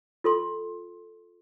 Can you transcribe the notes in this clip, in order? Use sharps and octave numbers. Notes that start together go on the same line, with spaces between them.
F4 A4 C6